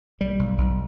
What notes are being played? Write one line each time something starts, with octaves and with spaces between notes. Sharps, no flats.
B1 G3
B1
B1